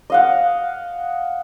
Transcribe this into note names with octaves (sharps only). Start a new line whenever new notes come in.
D#5 F5 F#5